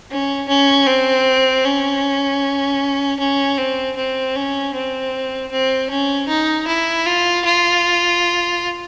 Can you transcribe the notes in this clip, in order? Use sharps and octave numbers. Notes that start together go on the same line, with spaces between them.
C#4
C#4
C4
C#4
C#4
C4
C4
C#4
C4
C4
C#4
D#4
E4
F4
F4